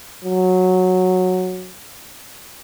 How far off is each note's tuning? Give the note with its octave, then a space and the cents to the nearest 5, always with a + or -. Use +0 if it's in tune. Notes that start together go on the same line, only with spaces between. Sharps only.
F#3 -10